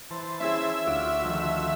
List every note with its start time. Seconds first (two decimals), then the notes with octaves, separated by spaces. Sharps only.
0.11 E3 C5 A5
0.40 C#4 E4 G#4 E5 E6
0.87 D2 D4 F4 F#4 D5 F5
1.24 F2 D#3